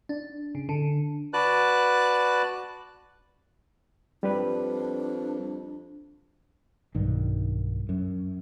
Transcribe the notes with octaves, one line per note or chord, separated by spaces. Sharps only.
D4
C#3
D3
F#4 B4 D5 A5 F#6
F2 G3 D4 G4 B4
B1 G2 D#3
F#2